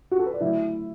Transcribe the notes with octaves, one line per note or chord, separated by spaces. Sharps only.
F#4
A4
B4
D5
D3 F#3 A3 E4 E5